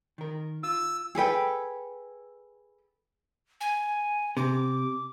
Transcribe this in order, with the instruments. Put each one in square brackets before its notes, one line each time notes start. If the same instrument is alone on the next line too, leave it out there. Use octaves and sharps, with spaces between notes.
[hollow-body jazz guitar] D#3 A#4
[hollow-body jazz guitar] F4 [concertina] E6
[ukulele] G#4 A4 B4 G5
[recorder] G#5
[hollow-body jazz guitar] C3 [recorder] D6